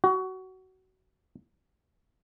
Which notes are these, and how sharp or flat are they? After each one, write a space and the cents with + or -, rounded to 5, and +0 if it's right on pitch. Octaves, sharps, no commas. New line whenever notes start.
F#4 +20